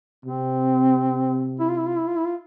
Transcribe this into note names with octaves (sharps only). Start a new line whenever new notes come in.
C3 C4
E4
F4
E4
F4
E4
F4
E4
F4